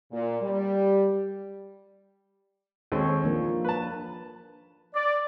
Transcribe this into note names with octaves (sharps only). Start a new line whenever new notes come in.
A#2
G3
D#2 G#3 C4 A4 C#5
F3 A#3 D4
B4 A5
D5